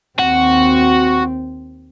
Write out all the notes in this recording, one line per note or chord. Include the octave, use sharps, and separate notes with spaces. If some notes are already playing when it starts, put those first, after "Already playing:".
D#2 C4 F#4